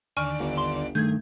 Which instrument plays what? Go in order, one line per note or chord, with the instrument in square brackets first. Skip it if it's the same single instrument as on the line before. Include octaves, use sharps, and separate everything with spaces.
[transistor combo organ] D#2 D3 D5 [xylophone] G#5 C#6 F6
[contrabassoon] G1
[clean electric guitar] C6
[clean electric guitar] G2 D#3 A3 [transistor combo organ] G#4 [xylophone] G6 G#6